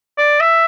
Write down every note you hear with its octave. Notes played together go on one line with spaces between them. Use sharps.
D5
E5